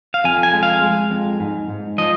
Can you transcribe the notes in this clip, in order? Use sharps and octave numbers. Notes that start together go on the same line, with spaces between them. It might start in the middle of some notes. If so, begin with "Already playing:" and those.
F5
F2 G#5
G#5
G#3
F5
G#3
F2
G#2
G#2
F3 D#5